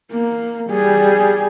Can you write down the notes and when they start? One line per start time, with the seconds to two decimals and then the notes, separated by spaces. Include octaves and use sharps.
0.12 A#3
0.70 G3 G#4